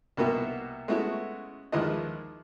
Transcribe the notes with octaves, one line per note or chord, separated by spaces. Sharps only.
C2 B2 A#3 B3 F#4 E5
G#3 A3 B3 C#4 E4 F#4
D#2 F3 G#3 E4 B4 D#5